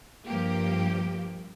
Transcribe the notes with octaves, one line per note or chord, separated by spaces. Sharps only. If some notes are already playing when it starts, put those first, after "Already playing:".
G2 F3 A#3 G4